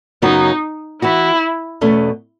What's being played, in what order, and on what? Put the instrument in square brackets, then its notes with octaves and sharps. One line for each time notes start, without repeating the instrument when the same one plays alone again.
[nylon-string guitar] F#2 C#3 F#3 B3 F#4 [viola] D#4
[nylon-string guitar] E3 B3 F#4 [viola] E4
[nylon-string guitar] E2 B2 A3 C#4